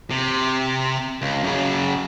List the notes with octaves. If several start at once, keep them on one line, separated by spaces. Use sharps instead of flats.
C3
C#2
F#2 C#3